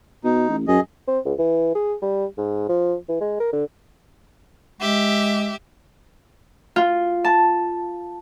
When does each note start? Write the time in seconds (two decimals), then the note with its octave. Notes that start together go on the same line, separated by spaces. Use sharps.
0.24 B2 D#4
0.49 A1
0.68 F#2 G#4 D#5
1.08 C4
1.25 C#2
1.39 E3
1.75 G#4
2.02 G3
2.38 G#2
2.69 F3
3.09 E3
3.21 G#3
3.40 A#4
3.53 D3
4.81 G#3 G4 E5
6.76 F4
7.24 A5